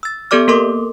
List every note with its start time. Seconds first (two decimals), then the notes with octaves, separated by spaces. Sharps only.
0.03 E6 A6
0.31 B3 G4 A4 D5 D6 F6
0.48 A#3 A4 A#4 C6 D6